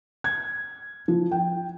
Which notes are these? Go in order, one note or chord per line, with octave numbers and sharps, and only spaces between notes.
G#6
F3
G5